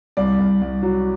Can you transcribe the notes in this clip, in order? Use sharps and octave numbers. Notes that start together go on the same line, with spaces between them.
C2 D5
C2
C2
F#3